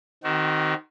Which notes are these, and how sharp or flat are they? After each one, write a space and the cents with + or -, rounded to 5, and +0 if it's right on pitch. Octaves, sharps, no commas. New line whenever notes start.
D#3 +0 C4 +0 F#4 +35